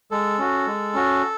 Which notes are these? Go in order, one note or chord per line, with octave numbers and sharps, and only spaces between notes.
G#3 A4
C#4 F#4
G#3
C#4 F#4